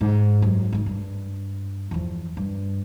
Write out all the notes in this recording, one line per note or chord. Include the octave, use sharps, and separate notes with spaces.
G#2
F#2
F2 G#2
G2
E2 F3
G2